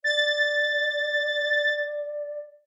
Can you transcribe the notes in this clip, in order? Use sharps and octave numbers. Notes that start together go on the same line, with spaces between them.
D5 A6